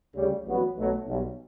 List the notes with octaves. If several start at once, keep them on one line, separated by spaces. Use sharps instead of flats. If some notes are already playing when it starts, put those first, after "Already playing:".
D2 C#3 G3
A1 G2 F#3 B3 F#4
B1 B2 F#3 A3
B1 B2 G3